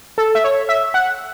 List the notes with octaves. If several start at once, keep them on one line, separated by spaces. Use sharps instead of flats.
A4
E5
C#5
E5
F#5